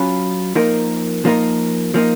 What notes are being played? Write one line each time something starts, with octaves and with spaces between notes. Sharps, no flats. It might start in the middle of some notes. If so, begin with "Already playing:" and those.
Already playing: F#3 C#4 F4 B4
F3 A#3 D#4 A#4
F3 A#3 D#4 A#4
F3 A#3 D#4